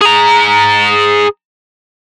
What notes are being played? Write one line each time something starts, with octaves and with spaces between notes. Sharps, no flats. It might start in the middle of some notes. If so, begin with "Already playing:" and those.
G#4 A#5